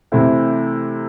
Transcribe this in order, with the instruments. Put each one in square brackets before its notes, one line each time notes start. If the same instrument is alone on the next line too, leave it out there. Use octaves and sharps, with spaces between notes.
[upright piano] C3 E3 A3 C4 E4